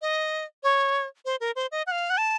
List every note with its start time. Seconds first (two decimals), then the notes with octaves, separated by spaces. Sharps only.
0.02 D#5
0.63 C#5
1.25 C5
1.40 A#4
1.56 C5
1.72 D#5
1.87 F#5
1.92 F5
2.10 F#5
2.18 A5